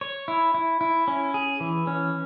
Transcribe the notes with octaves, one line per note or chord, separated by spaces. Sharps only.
C#5
E4
E4
E4
C#4
G#4
E3
C#4